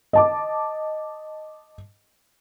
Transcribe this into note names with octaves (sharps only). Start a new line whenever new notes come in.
D#5 A5 D6